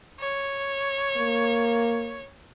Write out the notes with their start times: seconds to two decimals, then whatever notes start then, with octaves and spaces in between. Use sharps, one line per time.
0.19 C#5
1.17 A#3